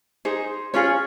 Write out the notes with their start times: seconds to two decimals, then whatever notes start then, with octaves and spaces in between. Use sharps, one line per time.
0.25 D#4 G#4 C5
0.74 C#4 F4 G#4 C#5